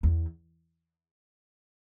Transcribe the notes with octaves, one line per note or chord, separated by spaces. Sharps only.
E2